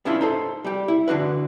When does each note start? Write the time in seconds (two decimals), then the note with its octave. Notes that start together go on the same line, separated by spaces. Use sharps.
0.05 B3 C#4 D4 E4 F4
0.21 D#4 A4 C5
0.65 G3 G4
0.88 E4
1.08 D3 D4 F#4 B4